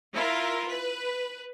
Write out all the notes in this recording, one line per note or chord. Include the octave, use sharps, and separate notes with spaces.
E4 F4 A#4
B4